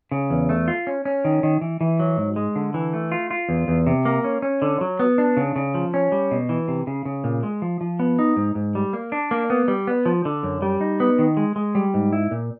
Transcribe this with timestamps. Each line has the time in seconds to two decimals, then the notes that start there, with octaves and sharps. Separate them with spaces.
0.11 C#3
0.30 E2
0.49 A3
0.68 F4
0.87 C#4
1.05 C#4
1.25 D#3
1.43 D#3
1.61 E3
1.81 E3
2.00 F#3
2.17 G#2
2.36 G#3
2.56 D3
2.74 E3
2.93 A3
3.12 F4
3.31 F4
3.49 E2
3.68 E2
3.87 C3
4.05 A#3
4.24 C#4
4.42 C#4
4.62 D3
4.81 F#3
4.99 B3
5.18 D4
5.37 C#3
5.56 C#3
5.74 F3
5.94 C#4
6.12 G3
6.31 B2
6.49 E3
6.68 C3
6.87 C#3
7.05 C#3
7.24 A#2
7.43 G#3
7.62 F3
7.81 F3
7.99 B3
8.19 D#4
8.36 G#2
8.55 G#2
8.75 G3
8.93 A#3
9.12 D4
9.31 A#3
9.50 B3
9.68 G3
9.87 B3
10.06 F3
10.25 D3
10.43 F#2
10.62 G3
10.81 D#4
11.00 B3
11.19 D#3
11.37 G#3
11.56 G#3
11.75 G3
11.94 G#2
12.13 E4
12.31 A#2